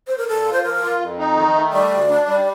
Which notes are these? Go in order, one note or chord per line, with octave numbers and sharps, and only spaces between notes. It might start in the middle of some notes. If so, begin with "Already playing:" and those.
C5
A#4
A#2 A4
F4
C5
F3 A#4
F4
F2
D#4
D#3
A3
G3 D5
D2
D4
G3